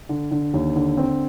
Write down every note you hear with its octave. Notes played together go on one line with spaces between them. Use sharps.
D3
D3
D#2
D3
C4